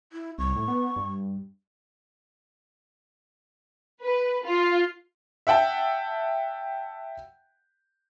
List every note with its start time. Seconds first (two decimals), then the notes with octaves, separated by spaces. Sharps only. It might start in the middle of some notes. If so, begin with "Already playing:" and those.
0.13 E4
0.38 C2 C#6
0.56 A2
0.68 B3
0.96 G2
4.03 B4
4.46 F4
5.47 E5 F#5 G5 A5